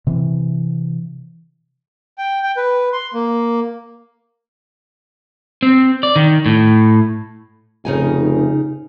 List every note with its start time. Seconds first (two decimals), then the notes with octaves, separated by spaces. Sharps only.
0.07 C3 E3
2.18 G5
2.43 G5
2.57 B4
2.93 C6
3.14 A#3
5.63 C4
6.03 D5
6.16 D#3
6.46 A2
7.85 F1 C#3 D#4 G#5